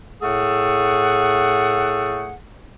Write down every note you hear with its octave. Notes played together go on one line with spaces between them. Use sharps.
A2 A3 G#4 A4 F#5